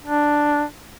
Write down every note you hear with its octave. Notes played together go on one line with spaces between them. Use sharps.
D4